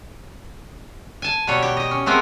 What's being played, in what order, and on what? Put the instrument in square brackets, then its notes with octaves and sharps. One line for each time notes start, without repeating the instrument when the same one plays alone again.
[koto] G#5 A5
B2 F#3 G3 C#5
G4
G4 D#5
C#4
A3 B3 C4 G#4 A#4